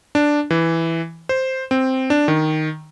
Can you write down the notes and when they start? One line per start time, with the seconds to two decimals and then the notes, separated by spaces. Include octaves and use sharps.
0.15 D4
0.50 E3
1.29 C5
1.71 C4
2.10 D4
2.28 D#3